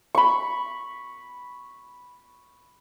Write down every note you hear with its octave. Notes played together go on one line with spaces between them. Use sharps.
B5 C#6